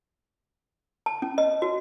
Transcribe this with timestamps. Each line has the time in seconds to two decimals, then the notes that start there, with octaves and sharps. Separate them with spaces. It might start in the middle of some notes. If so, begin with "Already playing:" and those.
1.06 A5
1.22 C#4
1.38 D#5
1.62 F#4